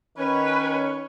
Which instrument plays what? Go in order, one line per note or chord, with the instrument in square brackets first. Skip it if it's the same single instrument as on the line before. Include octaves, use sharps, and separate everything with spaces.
[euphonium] D#3 [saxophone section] C#4 [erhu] B4 [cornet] C#5